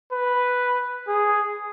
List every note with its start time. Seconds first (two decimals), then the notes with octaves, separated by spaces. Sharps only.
0.12 B4
1.08 G#4